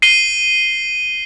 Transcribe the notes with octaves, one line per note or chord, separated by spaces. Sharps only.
C7 D#7 G7